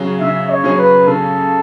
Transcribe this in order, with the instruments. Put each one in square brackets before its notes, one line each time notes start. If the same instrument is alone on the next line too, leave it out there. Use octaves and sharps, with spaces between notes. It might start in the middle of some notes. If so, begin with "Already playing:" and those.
Already playing: [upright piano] C#3 F#3 C#4 G#4
[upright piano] C#3 [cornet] E5
[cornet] C#5
[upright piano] F#3 C#4 G#4
[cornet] B4
[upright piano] C#3 [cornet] A4